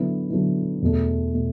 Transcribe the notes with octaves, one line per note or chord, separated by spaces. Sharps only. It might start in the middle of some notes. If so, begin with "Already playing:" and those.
Already playing: D3 F#3 B3 E4
D3 F#3 B3 E4
E2 B2 A3
B2 A3